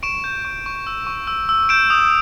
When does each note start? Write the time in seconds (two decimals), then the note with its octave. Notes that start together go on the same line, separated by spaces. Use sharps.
0.03 C#6 D7 E7
0.24 G6
0.45 C#6
0.66 C#6
0.87 E6
1.07 C#6
1.27 E6
1.49 E6
1.69 G6 D7 E7
1.90 D#6